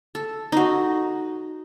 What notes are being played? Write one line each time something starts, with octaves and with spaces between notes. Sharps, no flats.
A4
D#4 F#4